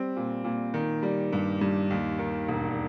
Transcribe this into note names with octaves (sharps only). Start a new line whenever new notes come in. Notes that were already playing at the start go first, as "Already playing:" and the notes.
Already playing: G3 C4
A#2
A#2
D#3
G3
G2
G2
D#2
D#3
E1